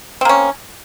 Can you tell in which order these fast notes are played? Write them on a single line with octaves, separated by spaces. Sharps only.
C4 A#3 C#4